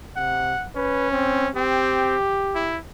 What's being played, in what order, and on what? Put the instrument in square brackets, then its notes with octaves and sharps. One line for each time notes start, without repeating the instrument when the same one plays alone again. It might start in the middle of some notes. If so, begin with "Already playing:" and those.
[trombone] C3 [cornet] F#5
[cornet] C#4 [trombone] B4
[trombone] C4
[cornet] C4 [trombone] G4
[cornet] E4